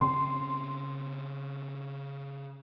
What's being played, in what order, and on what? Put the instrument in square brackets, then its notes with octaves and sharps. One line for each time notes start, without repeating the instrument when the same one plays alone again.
[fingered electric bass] C#3 C4 C#4 [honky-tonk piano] C6